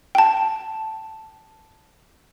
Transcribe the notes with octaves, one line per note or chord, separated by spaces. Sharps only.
G5 A5